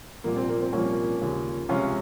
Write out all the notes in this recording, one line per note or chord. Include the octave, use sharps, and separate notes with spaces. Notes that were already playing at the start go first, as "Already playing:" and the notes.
C2 A#2 F3 A#3
C4
A#3
C4
C2 A#2 F3 A#3 C#4
D#2 C#3 F3
C#2 C3 F3 C#4 F4